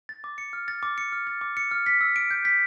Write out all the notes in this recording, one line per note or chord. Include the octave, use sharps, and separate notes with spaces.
A6
D6
C#7
F6
A6
D6
C#7
F6
A6
D6
C#7
F6
B6
E6
D7
G6
B6